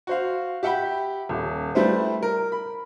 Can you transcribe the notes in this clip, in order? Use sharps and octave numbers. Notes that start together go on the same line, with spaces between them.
F#4 C5 F5
G4 E5 F#5 G5 B5
D#1
G3 A3 E4 B4 C5
A#4
B5